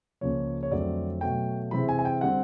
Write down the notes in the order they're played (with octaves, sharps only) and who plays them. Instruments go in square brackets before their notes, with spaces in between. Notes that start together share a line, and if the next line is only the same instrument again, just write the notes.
[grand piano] C#2 C#3 F3 A#3 C#4 C#5
C#5
F2 D3 F#3 A3 C4 D5
B2 F#3 A3 G5
C3 E3 G#3 C4 B5
G#5
G#5
G5
D3 G3 C4 F#5